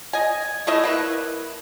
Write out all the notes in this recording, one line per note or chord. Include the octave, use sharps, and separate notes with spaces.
D#5 G#5
A3 E4 D#5 E5
A#3 E4 B4